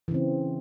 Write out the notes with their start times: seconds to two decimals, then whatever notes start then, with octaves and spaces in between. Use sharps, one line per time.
0.08 E3
0.11 C#3
0.14 C4